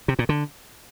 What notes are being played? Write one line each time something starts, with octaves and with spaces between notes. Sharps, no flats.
C3
A#2
D3